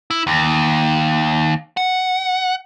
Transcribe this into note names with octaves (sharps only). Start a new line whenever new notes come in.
E4
D#2
F#5